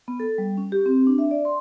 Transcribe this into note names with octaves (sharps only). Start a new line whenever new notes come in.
B3
A4
G3
C#4
G4
C4
D4
E5
D5
C6